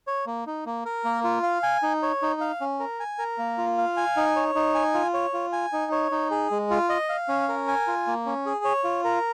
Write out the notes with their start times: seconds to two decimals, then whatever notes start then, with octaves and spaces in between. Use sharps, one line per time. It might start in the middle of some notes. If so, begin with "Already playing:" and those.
0.07 C#5
0.27 A#3
0.47 D#4
0.66 A#3
0.86 A#4
1.04 A#3
1.24 F4
1.43 F5
1.63 G#5
1.83 D#4
2.02 C#5
2.22 D#4
2.41 F5
2.61 C#4
2.80 A#4
3.00 G#5
3.19 A#4
3.38 A#3
3.58 F4
3.78 F5
3.97 G#5
4.17 D#4
4.36 C#5
4.55 D#4
4.75 G#5
4.94 F4
5.14 C#5
5.34 F4
5.53 G#5
5.73 D#4
5.92 C#5
6.11 D#4
6.31 G#4
6.51 G#3
6.70 F4
6.89 D#5
7.09 F5
7.29 C#4
7.48 A#4
7.68 G#5
7.87 F4
8.07 A#3
8.26 C#4
8.46 G#4
8.64 C#5
8.84 F4
9.04 A#4